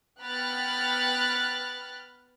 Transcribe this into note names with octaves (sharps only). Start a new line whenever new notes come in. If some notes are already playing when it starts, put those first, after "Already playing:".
B3 G5 B5 F6 F#6 A6